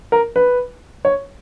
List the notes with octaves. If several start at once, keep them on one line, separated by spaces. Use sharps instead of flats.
A#4
B4
C#5